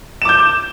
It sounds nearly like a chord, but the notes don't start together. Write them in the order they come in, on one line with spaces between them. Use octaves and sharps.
E7 D6 G6